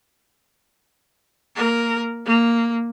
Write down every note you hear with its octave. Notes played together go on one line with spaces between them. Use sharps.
A#3 A#4
A#3